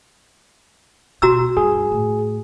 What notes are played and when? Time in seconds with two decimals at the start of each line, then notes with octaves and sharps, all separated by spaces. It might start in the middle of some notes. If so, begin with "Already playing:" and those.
1.22 B2 F#4 A#5 E6
1.57 G2 G#4
1.92 A2